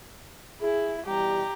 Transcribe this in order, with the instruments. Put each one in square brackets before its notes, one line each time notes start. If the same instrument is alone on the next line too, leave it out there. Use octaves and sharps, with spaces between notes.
[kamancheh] E4 [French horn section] G#4
[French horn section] B2 E3 G3 [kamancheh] G4 A#5